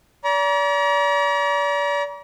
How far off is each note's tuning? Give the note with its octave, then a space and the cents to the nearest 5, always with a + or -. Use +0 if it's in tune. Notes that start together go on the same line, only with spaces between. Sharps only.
D5 -40 A#5 +40